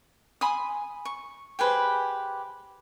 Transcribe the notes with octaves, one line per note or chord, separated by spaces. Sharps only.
G#5 B5 C6 D#6
C#6
G4 G#4 B4 C5